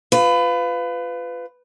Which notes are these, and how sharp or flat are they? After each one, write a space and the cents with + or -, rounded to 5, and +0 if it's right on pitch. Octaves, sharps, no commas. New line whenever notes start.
F4 +0 B4 +25